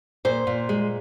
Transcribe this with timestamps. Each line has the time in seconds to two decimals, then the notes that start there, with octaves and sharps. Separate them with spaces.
0.25 A#2 C5
0.47 A#2
0.69 G#3